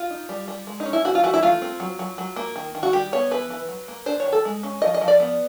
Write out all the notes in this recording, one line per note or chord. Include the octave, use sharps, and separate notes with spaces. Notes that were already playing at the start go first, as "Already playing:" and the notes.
Already playing: F4
D#4
G3
G3
G#3
D#4
C#4
E4
E3 F#4
F4
E3 F#4
E4
A3 F4
C4
F#3
F#3
F#3
A#3
D#3
D#3
F#4
G3 G4
B3 C#5
E3 B4
E3
F#3
A#3
D4 C5
C#5
D#3
A4
G#3
C#4
F3 D#5
D#5
F3
D5
B3